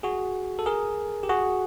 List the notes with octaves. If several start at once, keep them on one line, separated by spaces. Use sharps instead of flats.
F#4 G#4
A4
G#4 A#4
G4
F#4 G#4